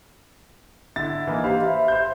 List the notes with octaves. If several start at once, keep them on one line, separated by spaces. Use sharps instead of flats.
D3 E4 A6
E3 A#3 D#4
G4 C5 F5 B5
E5
C5 G6